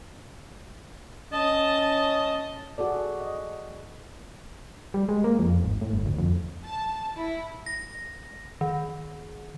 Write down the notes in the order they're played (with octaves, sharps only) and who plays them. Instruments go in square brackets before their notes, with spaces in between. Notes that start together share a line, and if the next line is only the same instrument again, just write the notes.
[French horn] C#4 [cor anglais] D#5 [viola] A5
[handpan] F#4 G#4 A4 D5
D#5
[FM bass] G3
G#3
A#3
F2
G#1
A2
G1
D2
F2
[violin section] A5
E4
[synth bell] A#6
D#3